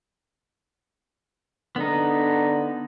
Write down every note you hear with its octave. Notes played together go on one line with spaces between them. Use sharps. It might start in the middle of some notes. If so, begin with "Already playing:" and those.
D3 B3 D#4